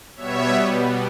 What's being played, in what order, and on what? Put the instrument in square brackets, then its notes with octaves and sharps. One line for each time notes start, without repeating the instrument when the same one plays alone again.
[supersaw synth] B2 G3 B3 C#5 E5